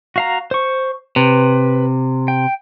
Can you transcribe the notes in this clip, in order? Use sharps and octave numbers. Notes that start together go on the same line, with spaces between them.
F#4 F5 A#5
C5 C#6
C3 B4
G5